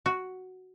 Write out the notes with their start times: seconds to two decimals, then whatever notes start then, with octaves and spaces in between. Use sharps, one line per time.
0.06 F#4